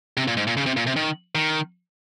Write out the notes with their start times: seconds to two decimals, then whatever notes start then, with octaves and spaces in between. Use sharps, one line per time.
0.17 C3
0.28 A#2
0.37 G#2
0.47 A#2
0.57 C#3
0.66 C3
0.77 A#2
0.87 C3
0.96 D#3
1.35 D#3